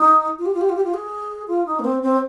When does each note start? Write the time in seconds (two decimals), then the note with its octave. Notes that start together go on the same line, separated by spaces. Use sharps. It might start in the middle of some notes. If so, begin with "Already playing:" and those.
Already playing: D#4
0.39 F4
0.46 G4
0.54 F4
0.61 G4
0.69 F4
0.76 G4
0.84 F4
0.94 G#4
1.48 F4
1.66 D#4
1.79 A#3
1.84 C4
2.02 C4